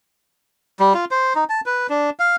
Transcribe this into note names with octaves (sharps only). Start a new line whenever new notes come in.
G3
F4
C5
D#4
A5
B4
D4
F5